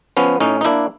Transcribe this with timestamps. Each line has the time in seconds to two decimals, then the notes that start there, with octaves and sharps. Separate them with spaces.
0.17 F3 B3 C#4
0.40 A2 C#4 D#4
0.61 D#4
0.65 A#3 D4 E4